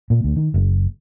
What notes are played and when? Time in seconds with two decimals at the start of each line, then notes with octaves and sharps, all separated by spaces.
0.10 A#2
0.24 D2
0.36 D#3
0.54 F#1